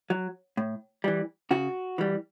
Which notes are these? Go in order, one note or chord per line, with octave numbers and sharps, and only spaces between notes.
F#3
A2
E3 G3
C#3 F#4
E3 G3